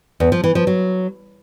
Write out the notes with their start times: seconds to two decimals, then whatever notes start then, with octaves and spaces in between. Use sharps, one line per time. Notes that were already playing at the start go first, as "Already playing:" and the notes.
0.20 E2
0.32 F3
0.44 E3
0.55 F3
0.67 F#3